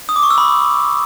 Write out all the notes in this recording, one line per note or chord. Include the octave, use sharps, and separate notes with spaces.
D#6
D6
C#6
E6
B5